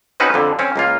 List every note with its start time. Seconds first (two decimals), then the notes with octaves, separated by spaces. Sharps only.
0.20 C4 C#4 D#4 F#4 B4
0.34 F2 D3
0.59 C4 C#4
0.76 C#2 A#3 F4